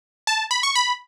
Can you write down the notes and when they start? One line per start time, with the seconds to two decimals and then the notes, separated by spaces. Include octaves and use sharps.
0.27 A5
0.51 B5
0.63 C#6
0.75 B5